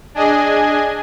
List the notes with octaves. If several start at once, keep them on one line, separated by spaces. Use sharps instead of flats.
D4 G#4 D#5 G#5